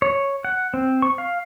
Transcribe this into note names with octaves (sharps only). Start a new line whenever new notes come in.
C#5
F#5
C4
C#6
F5